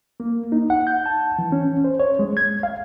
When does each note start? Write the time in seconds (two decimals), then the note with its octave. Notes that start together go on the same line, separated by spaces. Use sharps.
0.20 A#3
0.52 D#4
0.70 F#5
0.87 G6
1.06 A5
1.39 E3
1.52 C#4
1.84 C5
2.00 C#5
2.19 G#3
2.37 G#6
2.63 F5